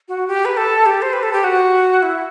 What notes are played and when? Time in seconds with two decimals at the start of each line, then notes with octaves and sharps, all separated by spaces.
0.08 F#4
0.27 G4
0.45 B4
0.57 A4
0.86 G4
1.02 C5
1.13 B4
1.23 A4
1.33 G4
1.44 F#4
2.02 E4